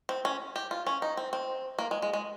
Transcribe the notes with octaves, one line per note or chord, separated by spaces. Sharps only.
C4
C#4
G4
F4
C#4
D#4
C4
C4
A#3
G#3
G#3
G#3